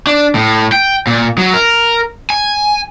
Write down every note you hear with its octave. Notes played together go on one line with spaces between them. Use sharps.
D4
A2
G5
A#2
F#3
A#4
G#5